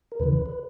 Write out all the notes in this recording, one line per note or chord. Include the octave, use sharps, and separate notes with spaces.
A#4
D#2 C#3 E3 B4
B4
B4